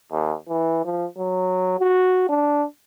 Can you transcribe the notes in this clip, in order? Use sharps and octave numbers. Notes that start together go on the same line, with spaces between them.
D#2
E3
F3
F#3
F#4
D4